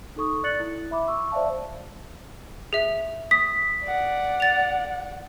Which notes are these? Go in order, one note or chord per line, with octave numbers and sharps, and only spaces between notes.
D#4 A4 C#6 D#6
D5 F#6 A6 C#7 F#7
E4
E5 B5 D6
C#6 E6
C5 D5 E5 F5 A5
G#4 E5
D#6 B6
D5 F#5
A6 F7